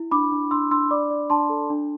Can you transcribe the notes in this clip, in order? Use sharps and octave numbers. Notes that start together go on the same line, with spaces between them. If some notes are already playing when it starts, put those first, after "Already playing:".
Already playing: E4
D4 B5 D6
D4
D4 C6 E6
D4 C6 E6
D5 B5 D6
D5
D4 A5 C6
A4
D4